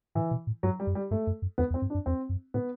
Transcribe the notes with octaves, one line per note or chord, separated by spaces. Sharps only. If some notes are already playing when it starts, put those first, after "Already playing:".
A2 E3
B2
A2
G2 F#3
G3
F#2
G3
G2 A3
F#2
F#2
E2 B3
E2
C4
G2
D4
F#2
E2 C4
F#2
A2 B3